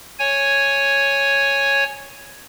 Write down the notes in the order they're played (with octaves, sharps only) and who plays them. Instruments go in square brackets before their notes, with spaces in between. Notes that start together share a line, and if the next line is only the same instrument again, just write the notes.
[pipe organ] C#5 G#5